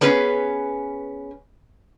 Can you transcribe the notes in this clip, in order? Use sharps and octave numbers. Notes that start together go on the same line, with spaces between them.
B3 C#4 G#4 B4